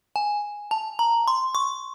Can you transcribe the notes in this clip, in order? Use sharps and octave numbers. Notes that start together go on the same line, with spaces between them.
G#5
A5
A#5
C6
C#6